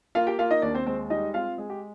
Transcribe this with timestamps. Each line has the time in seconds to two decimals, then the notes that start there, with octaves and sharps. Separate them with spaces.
0.15 A#3 F4 F5
0.27 G4 G5
0.39 A#3 F4 F5
0.51 D#4 D#5
0.62 D#2 D4 D5
0.75 C4 C5
0.87 G#3 C4 C5
1.10 G3 D#4 D#5
1.34 C4 F4 F5
1.58 G#3 G#4
1.70 G4